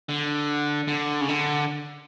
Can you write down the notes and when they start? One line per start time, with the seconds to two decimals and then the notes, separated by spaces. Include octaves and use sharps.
0.09 D3
0.88 D3
1.21 C#3
1.28 D3